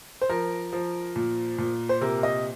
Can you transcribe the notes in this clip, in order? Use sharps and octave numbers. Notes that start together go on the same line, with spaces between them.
C5
F3 A#4
F3
A#2
A#2
C5
C3 A#4
D#5